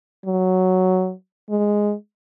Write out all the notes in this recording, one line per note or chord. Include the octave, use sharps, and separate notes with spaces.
F#3
G#3